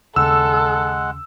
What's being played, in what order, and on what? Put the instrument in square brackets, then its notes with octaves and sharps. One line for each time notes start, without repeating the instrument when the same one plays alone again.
[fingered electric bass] D#2 C#3 [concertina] G#3 F#5 [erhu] A4 [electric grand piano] E6